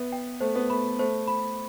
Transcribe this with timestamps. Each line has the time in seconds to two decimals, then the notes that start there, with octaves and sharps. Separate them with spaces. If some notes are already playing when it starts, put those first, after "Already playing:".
Already playing: B3 E5
0.12 G5
0.41 A3 C5
0.55 B3
0.69 A3 B5
0.99 A3 C5
1.28 B5